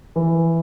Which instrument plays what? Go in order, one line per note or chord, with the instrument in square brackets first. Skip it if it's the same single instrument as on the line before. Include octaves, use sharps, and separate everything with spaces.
[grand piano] E3